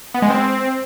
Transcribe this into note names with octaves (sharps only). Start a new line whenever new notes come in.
B3
G#3
C4